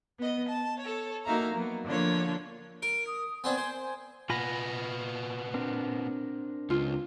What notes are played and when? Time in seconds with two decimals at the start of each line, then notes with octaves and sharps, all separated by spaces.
0.18 B3 D#5
0.47 A5
0.80 A4 C#5
1.25 A#3 D#4 F#4 E5 F5 A#5
1.54 F#3 A#3 B3
1.85 D3 F3 A#3 D4 F4 C#5
2.83 A#4 D7
3.07 D#6
3.44 B3 C4 D4 G#5
3.58 C5
3.83 G#5
4.30 A#2 B3 F4 G#5 B5 A#6
5.54 C4 D4 A#4
6.70 C#2 F4